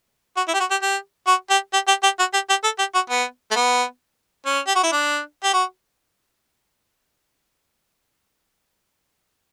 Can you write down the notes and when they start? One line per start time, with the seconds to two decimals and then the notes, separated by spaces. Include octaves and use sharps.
0.37 F#4
0.48 E4
0.54 G4
0.60 F#4
0.71 G4
0.82 G4
1.27 F#4
1.50 G4
1.73 G4
1.88 G4
2.03 G4
2.19 F#4
2.34 G4
2.49 G4
2.64 A4
2.79 G4
2.94 F#4
3.10 B3
3.51 A3
3.55 B3
4.46 C#4
4.67 G4
4.75 F#4
4.83 E4
4.92 D4
5.44 G4
5.54 F#4